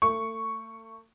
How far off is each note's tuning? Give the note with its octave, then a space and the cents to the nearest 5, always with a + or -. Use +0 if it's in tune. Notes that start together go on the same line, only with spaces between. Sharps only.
A3 +35 C#6 +0